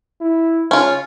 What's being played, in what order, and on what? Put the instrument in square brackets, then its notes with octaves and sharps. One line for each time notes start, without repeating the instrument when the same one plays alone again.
[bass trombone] E4
[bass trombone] C#3 [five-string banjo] C#4 F4